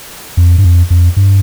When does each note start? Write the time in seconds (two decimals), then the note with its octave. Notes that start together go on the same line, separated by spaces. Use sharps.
0.37 F2
0.58 G2
0.64 F2
0.90 F2
1.17 G2